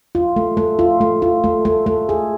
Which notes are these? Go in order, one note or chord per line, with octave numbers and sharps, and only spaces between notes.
F4
A3
A3
F4
A3
F4
A3
A3
A3
G#4